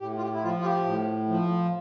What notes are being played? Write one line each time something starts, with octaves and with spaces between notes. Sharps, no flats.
A2 G4
F4
G4
E4
F3 F4
F4
G4
A2
F3